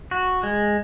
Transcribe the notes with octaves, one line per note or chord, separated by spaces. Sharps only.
F#4
G#3